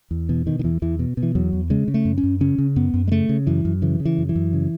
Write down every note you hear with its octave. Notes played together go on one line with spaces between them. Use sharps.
E2
B2 E3
B2 D#3
D#3
E2 E3
E2 E3
B2
B2
E3
E2 F#3
E2
C#3 G#3
C#3
A3
F#2
C#4
F#2
C#3 C#4
C#3
F#2 B3
F#2
G#3
C#3 A3
C#3
F#2 E3
F#2
C#3 E3
C#3
E3
F#2
E3
F#2
C#3